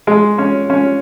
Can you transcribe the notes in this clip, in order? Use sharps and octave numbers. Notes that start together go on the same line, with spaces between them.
G#3
C#4
C#4